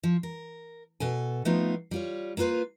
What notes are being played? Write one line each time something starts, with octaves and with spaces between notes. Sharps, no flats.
F3
A#4
B2 A4 G#5
F3 A3 B3 C4 D#4 F4
G3 F4 C#5
A#3 B3 F4 B4 C5